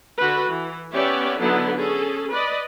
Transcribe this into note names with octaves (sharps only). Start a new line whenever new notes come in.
D3 F#4 A4 B4
E3
B3 C#4 G4 C#5 D5 E5
D3 F#3 B3 D#4 E4 A4
C#4 G#4 A4
B4 D5 D#5